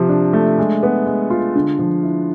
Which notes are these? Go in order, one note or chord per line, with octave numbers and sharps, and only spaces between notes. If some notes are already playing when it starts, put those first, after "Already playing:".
Already playing: C3 F3
D4
A3
G#3
B3
G#3
F4
D3
F3
E4